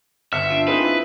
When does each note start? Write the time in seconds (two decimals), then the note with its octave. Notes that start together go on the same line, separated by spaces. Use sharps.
0.33 G1 E5 F6 C#7
0.50 D4 F4
0.68 C4 D#4 G#4 B4
0.84 E4